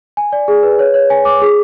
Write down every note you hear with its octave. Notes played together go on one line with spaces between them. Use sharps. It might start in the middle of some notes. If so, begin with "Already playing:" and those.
G#5
D5
G#4
B4
C#5
C#5
G#5
D6
G#4